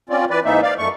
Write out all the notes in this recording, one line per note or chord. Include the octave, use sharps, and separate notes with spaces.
C4 C#4 F4 D5
E3 B4 D5
G#2 E3 A#3 D#4 E5
D5 F5
F#2 A3 C#6